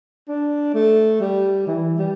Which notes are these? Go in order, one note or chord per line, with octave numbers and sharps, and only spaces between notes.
D4
A3
G3
E3
G3